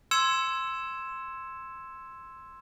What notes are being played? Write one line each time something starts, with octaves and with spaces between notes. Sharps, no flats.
C6 E6 G#6 C#7 E7